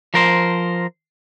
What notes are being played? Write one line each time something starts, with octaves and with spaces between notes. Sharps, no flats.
F3 A#4 C5